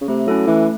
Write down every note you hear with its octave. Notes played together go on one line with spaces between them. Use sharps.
C#3
C3 A3
F#3 C#4 E4 A4
E3 A3